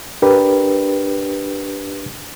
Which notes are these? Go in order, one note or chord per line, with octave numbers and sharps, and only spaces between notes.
D4 G4 A#4 B4